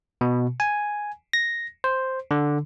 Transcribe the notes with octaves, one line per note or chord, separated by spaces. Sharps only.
B2
G#5
A#6
C5
D3